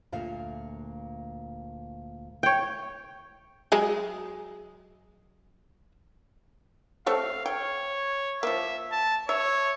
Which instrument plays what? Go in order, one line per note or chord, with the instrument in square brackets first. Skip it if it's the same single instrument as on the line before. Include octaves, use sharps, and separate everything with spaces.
[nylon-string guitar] D2 A#2 F5
[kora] C#5 G5
[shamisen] F#3 G#3 G#4
[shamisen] A3 C4 C#5 [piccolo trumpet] F5
[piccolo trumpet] C#5 [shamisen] G5
[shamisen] F3 A#3 [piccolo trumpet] E5
[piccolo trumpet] A5
[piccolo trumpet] C#5 [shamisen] E5